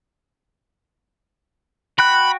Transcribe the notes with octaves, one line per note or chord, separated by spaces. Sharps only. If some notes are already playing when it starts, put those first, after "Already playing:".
F#4 G5 B5 F#6